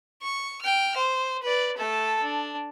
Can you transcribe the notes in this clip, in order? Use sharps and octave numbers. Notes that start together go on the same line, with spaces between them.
C#6
G5 F6
C5
B4 D5
A3 A4
D4